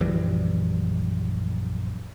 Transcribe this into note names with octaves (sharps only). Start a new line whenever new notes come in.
A#1 F#2 E3 G3